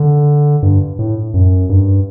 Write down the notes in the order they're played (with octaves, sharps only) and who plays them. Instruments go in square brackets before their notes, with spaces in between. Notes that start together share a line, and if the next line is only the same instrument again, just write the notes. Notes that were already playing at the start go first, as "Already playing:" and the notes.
Already playing: [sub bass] D3
G2
A2
F#2
G2